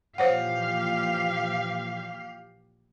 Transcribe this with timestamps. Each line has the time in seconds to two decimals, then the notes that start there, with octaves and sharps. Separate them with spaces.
0.18 A#2 E3 F3 G4 C5 C#5 F5 F#5